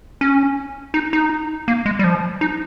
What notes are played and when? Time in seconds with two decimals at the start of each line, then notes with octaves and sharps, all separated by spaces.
0.21 C#4
0.94 D#4
1.13 D#4
1.68 A#3
1.86 G#3
1.99 G3
2.04 F3
2.41 D#4